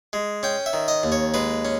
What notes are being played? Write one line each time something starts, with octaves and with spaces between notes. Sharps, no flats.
G#3
C#4 G5
E5
D#3
D#5
D#2
C#5
G#3 B4
C#4